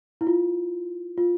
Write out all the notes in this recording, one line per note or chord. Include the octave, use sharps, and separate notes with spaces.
E4
F4
F4